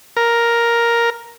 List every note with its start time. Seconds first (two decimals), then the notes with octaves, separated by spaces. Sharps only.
0.17 A#4